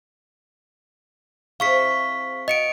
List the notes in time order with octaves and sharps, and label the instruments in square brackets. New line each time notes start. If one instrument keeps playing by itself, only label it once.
[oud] C4 E4 G#4 [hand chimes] F5 C#6 B6
[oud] F#4 [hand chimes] D#5 C#7 D7